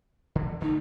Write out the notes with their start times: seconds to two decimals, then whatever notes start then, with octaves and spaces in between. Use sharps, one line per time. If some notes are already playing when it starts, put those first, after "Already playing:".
0.35 D3
0.62 D3 D#3 A3 D#4